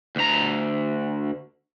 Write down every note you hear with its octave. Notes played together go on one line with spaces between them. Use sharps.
D2 A#5